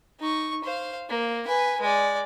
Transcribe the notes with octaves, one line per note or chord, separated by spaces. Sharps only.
D#4 C#6
C5 F5
A#3
B4 G#5
G#3 D5